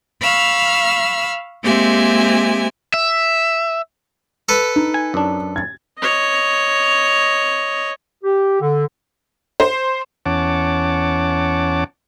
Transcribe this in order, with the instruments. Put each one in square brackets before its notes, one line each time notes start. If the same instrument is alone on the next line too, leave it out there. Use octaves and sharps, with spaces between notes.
[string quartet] F5 B5 C#6 E6 F6
G#3 A#3 C4 G4 E5 G#5
[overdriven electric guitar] E5
[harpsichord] A4 B4
[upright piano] D#4
[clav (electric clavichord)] G#5
F#2 D4
[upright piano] G#6 A6
[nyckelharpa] C#5 D#5
[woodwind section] G4
D3
[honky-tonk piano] C5
[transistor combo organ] E2 C#4 C#5 F#5 A5 D6